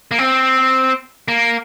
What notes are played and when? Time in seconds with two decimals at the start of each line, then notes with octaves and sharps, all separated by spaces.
0.11 A#3
0.19 C4
1.28 A#3